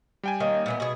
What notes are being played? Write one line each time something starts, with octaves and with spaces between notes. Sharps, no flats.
G3 G5 G#5
D#3 A#3 C#4
A#2 E3 B3
B2 G#4